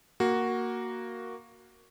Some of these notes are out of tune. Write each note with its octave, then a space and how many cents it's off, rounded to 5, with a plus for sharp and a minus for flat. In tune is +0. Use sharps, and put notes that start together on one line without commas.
A#3 +0 F#4 +0